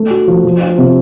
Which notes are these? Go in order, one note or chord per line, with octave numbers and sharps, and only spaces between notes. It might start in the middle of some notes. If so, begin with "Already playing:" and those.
Already playing: A3
F#4
F3
F3
F4
C3